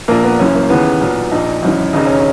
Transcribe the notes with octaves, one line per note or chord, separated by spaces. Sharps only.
A#1 A#2 A#3
B3
F#1 F#2 E3 C#4
A#3
D#2 C#3 E3 B3
B1 A#2
A#1 A#2 D#4
G#1 F#2 E3
E1 D#2 C#3 D#4
C#4